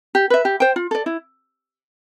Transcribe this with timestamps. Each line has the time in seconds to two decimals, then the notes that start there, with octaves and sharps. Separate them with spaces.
0.15 G4
0.30 B4 E5
0.45 G4
0.60 C5 G5
0.76 F4
0.91 A4 D5
1.06 E4